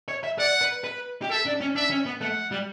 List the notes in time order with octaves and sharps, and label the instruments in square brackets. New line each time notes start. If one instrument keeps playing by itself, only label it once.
[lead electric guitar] C#5
E5
[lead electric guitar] D5 [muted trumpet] F#5
[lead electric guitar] B4
B4
G4
[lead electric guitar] A4 [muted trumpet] E5
[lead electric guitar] D4
C#4
[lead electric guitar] D4 [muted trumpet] E5
[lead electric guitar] C#4
B3
[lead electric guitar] A3 [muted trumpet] F#5
[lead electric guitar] G3